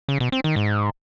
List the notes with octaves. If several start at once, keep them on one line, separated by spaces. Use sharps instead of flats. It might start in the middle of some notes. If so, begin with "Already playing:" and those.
C#3
B2
C4
D#3
G#2